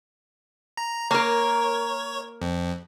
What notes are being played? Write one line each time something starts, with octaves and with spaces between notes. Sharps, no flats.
A#5
A#3 A#4 C#5
F2